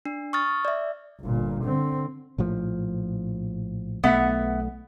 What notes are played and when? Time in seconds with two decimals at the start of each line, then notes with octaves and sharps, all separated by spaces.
0.05 D4
0.33 C#6 D#6 F6 A6
0.65 D5 E5
1.21 G1 A#2
1.64 D3 C4
2.38 A#1 A2 F3
4.04 B1 A3 B3 E5 F#5